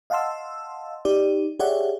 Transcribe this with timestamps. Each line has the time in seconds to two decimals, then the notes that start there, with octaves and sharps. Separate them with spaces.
0.10 D#5 F5 F#5 A5 C6 E6
1.05 D#4 G4 D5
1.59 G4 G#4 C#5 D5 E5 F#5